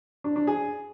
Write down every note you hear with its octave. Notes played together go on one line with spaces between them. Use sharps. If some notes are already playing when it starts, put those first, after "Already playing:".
D4
D4
G#4